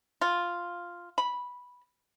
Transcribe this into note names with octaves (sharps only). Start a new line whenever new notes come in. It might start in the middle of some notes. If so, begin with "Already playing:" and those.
F4
B5